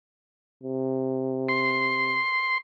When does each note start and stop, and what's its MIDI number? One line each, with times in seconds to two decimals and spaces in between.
0.64 2.19 48
1.49 2.58 84